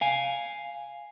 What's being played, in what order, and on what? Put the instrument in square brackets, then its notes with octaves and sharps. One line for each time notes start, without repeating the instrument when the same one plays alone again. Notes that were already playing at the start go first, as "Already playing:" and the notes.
[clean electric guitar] F5 G#5